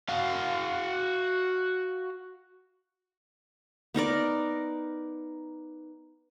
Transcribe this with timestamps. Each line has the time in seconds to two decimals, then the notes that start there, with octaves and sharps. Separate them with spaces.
0.09 F#4 F5
3.94 B3 D#4 A#4 D5